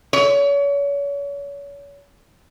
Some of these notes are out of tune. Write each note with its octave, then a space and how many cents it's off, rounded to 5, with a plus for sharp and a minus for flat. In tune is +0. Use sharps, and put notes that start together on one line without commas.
C#5 +35